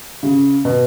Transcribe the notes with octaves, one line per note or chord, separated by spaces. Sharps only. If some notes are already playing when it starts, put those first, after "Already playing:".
C#3
B2